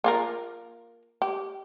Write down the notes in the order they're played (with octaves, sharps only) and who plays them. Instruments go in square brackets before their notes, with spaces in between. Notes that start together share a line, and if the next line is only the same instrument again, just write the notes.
[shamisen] A#3 F4 A#4
G4